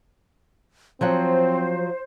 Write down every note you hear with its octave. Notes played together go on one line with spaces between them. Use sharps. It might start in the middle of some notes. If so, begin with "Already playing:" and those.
F3 F#3 C4 C5 F#5